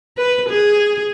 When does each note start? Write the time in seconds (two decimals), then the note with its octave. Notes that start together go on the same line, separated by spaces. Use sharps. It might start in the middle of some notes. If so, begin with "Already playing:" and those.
0.17 B4
0.49 G#4